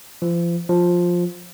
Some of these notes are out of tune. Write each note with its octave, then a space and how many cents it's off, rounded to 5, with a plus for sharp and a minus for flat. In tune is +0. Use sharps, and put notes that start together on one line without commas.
F3 -35
F3 +10